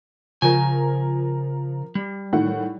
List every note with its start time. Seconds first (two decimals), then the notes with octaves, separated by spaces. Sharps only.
0.42 C#3 F3 A#4 G#5
1.95 G3
2.33 A2 D#3 F#5